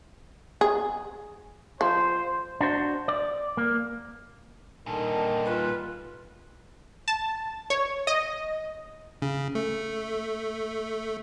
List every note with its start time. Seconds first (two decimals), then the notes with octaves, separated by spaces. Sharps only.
0.61 G#4
1.81 F3 C5
2.61 D4 F#4 C5
3.08 D5
3.57 A#3
4.86 A#2 D3 D#3 G3 A5
5.45 F4 B4
7.08 A5
7.70 C#5
8.07 D#5
9.22 C#3
9.55 A3